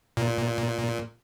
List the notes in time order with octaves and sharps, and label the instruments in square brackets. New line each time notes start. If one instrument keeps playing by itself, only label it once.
[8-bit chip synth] A#2